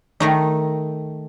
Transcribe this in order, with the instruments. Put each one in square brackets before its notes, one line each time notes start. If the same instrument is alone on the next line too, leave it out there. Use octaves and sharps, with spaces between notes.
[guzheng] D#3 A3 D#4